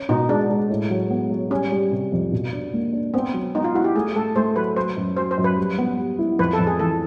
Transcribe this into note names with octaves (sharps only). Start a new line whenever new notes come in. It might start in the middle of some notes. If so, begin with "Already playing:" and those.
Already playing: C#4
B2 D#4
G#3 D4
G#3
A2
F#3
B3
F#3
G3 C#4
G3
C3
F2
B2
D4
A#3
D4
B3 C4
F#3
B3 D#4
F4
E4 F#4
G4
A3 G#4
A3 A4
A3 C5
F#3 B4
F#3 C5
F#2
F#3 C5
C5
F#2
B4
G3
B3
G3
E4
F2 B4
A4
F2
G#4
E3 A4